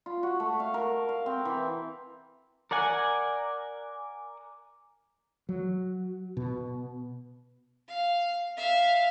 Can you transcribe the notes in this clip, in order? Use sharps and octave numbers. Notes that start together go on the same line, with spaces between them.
F4
F#4
A3
F5
A#4
F5
C4
E3
A#4 D5 F#5 G#5
F#3
B2
F5
E5 F5